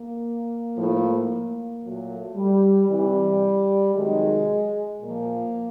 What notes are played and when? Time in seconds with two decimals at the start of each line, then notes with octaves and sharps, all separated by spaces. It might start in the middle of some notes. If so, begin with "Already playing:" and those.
Already playing: A#3
0.77 A2 F3
1.83 A#2 F#3 A3
2.36 G3
2.88 C3 E3 G3
3.95 C3 D#3 F#3 G#3
5.01 A#2 F3 A#3